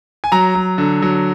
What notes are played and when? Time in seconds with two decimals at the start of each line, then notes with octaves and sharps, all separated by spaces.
0.24 G#5
0.32 F#3 A#5
0.55 F#3
0.78 D3
1.02 F#3